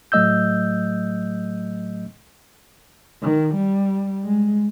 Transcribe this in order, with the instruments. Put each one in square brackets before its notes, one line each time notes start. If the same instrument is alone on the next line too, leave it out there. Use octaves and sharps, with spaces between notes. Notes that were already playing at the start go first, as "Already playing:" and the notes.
[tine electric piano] A2 F#3 A3 D#5 E6 G6
[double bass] D#3
G3
G#3